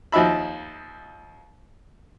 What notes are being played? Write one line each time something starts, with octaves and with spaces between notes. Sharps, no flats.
D#2 F3 D#4 E5 B5